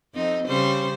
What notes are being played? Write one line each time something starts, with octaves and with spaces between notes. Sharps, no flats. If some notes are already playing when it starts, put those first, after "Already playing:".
F2 C4 D#4
C#3 G3 C5